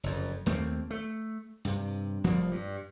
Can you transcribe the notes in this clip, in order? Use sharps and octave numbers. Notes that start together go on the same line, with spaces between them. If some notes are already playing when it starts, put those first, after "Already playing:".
F#1 F2
D#2 A3 A#3 C4
A3
G2 C3
F1 F3 G3 A#3
G2